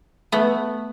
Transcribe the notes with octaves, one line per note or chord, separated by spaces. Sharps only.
A3 B3